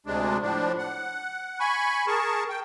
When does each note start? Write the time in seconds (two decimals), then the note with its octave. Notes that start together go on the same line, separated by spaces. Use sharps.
0.06 D2 C3 G#3 D4
0.42 A2 F3 D4
0.78 F#5
1.60 G#5 B5 C#6
2.07 G#4 A#4 A5 C#6
2.49 G5